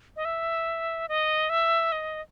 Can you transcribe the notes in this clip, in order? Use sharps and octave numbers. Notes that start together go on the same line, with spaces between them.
D#5
E5
D#5
E5
D#5